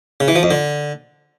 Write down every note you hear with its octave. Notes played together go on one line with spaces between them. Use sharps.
C#3
E3
F3
F2
D3